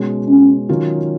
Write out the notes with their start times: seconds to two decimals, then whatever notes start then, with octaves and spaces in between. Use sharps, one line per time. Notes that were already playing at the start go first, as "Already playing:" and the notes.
Already playing: B2 G#3 C#4
0.29 C#4
0.69 D#3 F#3 C#4 F4